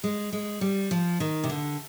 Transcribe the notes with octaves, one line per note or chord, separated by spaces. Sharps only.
G#3
G#3
G3
F3
D#3
C3
D3